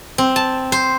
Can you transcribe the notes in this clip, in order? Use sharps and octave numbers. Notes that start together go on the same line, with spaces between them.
C4
A5
C5